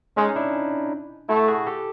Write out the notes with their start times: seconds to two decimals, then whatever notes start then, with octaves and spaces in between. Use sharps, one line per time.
0.17 G#3 C#4 D#4
0.36 D4 E4
1.29 A3 E4 F#4
1.48 F#4 G#4
1.67 G4 A4